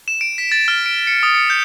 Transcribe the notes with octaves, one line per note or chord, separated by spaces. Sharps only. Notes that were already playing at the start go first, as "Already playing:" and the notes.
E7
D7
B6
A6
F6
D7
C#7
D#6
C#7
G6